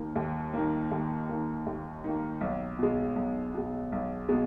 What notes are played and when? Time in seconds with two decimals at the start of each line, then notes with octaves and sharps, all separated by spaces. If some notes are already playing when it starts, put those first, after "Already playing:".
Already playing: D#2 D#3 A#3
0.16 D#2
0.54 D#3 A#3
0.91 D#2
1.29 D#3 A#3
1.66 D#2
2.04 D#3 A#3
2.41 B1
2.79 B2 G#3
3.16 B1
3.54 B2 G#3
3.92 B1
4.29 B2 G#3